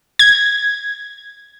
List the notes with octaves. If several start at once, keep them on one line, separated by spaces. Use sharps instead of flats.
G#6